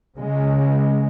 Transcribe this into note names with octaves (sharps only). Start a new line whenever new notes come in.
C#3 G#3